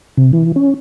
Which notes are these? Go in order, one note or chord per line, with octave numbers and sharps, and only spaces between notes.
C3
E3
C#4